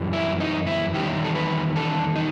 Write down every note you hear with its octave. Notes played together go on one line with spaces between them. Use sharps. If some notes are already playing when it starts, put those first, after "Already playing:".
Already playing: F#2 E3 G3
E4
D#4
E4
E2 D#3 G3 G4
A4
B4
A4
D#4